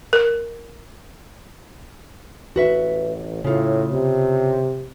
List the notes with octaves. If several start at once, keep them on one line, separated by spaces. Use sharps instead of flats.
A#4
A1 F#4 B4 E5
A2 C#3 F4
C3